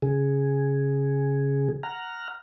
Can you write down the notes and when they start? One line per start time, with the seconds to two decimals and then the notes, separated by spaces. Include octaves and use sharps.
0.02 C#3 G#4
1.83 F#5 A#5 F6